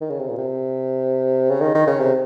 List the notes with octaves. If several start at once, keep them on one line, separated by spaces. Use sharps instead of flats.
D#3
C#3
C3
A#2
C3
C#3
D#3
D#3
C#3
C3